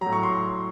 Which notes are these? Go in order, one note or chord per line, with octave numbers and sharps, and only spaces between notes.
F#3 A#5
A2
C#6
C6